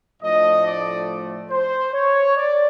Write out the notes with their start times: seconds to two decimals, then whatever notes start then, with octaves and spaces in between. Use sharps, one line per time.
0.21 A2 F3 A3 D4 D#5
0.64 D5
1.50 C5
1.93 C#5
2.36 D5